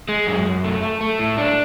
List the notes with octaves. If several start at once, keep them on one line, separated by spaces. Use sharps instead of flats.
G#3
F#2
F#2
A3
A3
A3
A2
D4